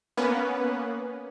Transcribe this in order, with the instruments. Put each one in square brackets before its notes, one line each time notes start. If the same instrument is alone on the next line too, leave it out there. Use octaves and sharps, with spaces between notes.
[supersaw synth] A#3 B3 C#4 B4